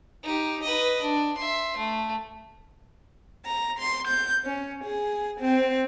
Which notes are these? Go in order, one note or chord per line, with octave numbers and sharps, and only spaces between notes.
D#4 G4
B4 D#5
D4
E5 C6
A3
A#5
C6
G6
C#4
G#4
C4